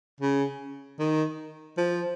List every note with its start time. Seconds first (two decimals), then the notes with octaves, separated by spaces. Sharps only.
0.20 C#3
0.99 D#3
1.77 F3